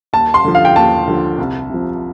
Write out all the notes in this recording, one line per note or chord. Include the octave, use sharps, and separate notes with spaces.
D#2 A5
C6
D3 F3
F5
G5
D#2 A5
D3 F3
C2
C3 F3